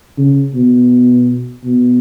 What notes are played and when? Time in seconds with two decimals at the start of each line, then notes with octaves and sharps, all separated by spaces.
0.18 C#3
0.55 B2
1.64 B2